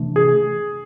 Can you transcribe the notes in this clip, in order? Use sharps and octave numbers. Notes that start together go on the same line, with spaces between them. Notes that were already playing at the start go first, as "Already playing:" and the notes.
Already playing: C3 E3 A3 D4
G#4